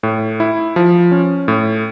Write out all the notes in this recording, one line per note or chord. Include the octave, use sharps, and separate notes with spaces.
A2
E4
F3
C#4
A2